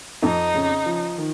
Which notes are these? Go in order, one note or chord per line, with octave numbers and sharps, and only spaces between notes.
F2 D#4
C#3
F3
D#3